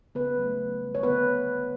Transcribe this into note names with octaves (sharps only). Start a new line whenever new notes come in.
C#3 B3 B4
F#3 A3
C#3
G3
C#5
D3 B3 B4